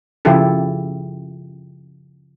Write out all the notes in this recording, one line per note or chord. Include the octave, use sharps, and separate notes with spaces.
C#3 F3 E4 F4 G4 A4